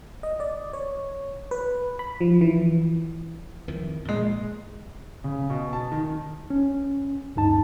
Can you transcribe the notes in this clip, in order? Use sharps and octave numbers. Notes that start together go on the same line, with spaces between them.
D#5
D5
C#5
B4
B5
F3
E3
F2 D#3 E3
A#2 G#3
C#3
B2
A5
D#3
C#4
D2 G2 D#4 A5